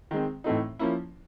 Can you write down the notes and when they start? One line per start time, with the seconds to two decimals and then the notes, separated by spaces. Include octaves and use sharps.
0.11 D#3 G#3 C4
0.44 A2 E3 A3 C4 D#4
0.79 F3 A#3 C#4 E4